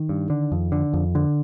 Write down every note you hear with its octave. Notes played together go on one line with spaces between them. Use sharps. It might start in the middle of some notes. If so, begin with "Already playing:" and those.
Already playing: D#3
G2
D3
F2
D3
F2
D3